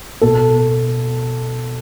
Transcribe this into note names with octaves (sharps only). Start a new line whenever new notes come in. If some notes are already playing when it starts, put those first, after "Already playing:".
B2 A4